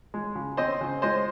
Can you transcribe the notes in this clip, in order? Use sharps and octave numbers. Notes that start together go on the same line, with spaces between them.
G#3
C#3
C4 C5 D#5
C#3
G#3 C5 D#5